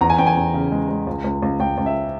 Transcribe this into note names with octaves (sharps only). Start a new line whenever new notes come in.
E2 A#5
G#5
E2 G5
G#5
E2
C#3
G#3
G#3
C#2
C#2
C#2
C#2 G5
C#2
E5